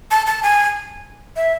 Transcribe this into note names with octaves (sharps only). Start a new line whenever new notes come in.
A5
A5
G#5
E5